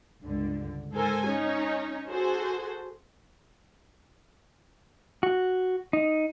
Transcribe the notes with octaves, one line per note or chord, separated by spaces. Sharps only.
C#2 G2 D3
G#2 A4 A#4 C5 G#5
C#4 D#4 C#5
F#4 G#4 A4 C5
F#4
D#4